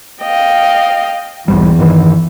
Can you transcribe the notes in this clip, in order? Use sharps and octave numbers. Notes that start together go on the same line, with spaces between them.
D#5 F5 G5
B1 E2 G#2 G3
G2 D#3 E3